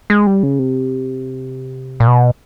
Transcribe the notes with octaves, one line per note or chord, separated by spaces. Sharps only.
G#3
G3
C#3
C3
A#2
B2